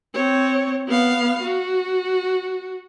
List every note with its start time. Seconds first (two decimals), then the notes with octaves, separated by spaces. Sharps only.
0.14 C4 C#5
0.87 B3 F5
1.42 F#4